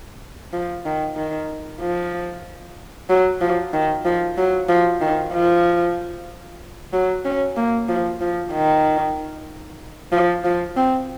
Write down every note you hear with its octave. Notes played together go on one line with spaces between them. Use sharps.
F3
D#3
D#3
F3
F#3
F3
D#3
F3
F#3
F3
D#3
F3
F#3
C#4
A#3
F3
F3
D#3
F3
F3
C4